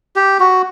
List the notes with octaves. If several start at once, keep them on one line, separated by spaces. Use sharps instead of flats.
G4
F#4